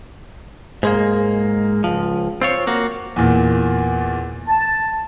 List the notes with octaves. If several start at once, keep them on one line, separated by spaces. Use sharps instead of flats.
G#2 G#3 A#3
C#2 F3
C4 F4 C#5
A#3 F#4
E2 A#2
A5